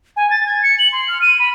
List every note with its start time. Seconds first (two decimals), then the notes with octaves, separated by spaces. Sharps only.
0.16 G#5
0.30 A6
0.46 G#6
0.63 C#7
0.79 F#7
0.92 C6
1.08 F6
1.21 D#7
1.39 B5